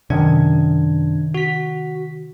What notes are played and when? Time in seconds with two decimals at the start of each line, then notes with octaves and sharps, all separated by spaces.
0.10 F#2 C3 D#3 D4 G#6
1.34 F#4 B6